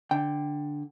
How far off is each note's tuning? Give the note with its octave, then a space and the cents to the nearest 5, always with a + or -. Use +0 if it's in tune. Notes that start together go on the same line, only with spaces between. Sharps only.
D3 +0 G5 +0